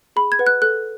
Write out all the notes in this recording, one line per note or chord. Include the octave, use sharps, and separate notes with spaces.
G#4 B5
G#6
B4 F#5
F#6
A4 F#6